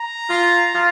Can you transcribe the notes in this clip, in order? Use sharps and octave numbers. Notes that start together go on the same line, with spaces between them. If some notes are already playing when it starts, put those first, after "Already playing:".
Already playing: A#5
F4
F4